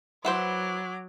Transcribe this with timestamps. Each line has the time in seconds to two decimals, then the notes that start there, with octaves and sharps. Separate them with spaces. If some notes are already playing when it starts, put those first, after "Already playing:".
0.25 F#3 E4 B4 C5 F#5 D6 E7 G7